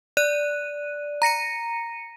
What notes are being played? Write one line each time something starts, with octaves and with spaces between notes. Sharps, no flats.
D5 F#6 D#7
A#5 A#6 C#7 D#7